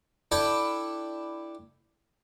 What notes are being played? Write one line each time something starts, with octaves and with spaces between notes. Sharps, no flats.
D4 E4 A4 D5 G5 B5